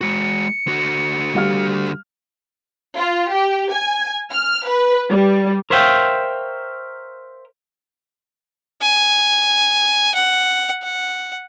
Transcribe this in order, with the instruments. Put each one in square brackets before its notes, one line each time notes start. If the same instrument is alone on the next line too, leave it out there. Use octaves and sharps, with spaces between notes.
[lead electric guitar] G#3 F#4 [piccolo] C#7
[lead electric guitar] D3 F#4
[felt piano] G3 F5 F6
[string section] F4
G4
G#5
F6
B4
G3
[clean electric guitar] A#4 C5 C#5 E5 F5 G5
[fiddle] G#5
F#5
F#5